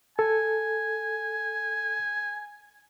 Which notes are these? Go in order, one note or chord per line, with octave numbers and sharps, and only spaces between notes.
A4 G#5